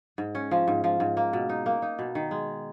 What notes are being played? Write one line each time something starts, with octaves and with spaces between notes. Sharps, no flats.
G#2
C#4
F3
G#2
F3
G#2
A#3
B2
D#4
A#3
D#4
B2
D#3
G#3